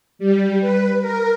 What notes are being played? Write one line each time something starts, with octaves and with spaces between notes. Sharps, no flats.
G3
B4
A#4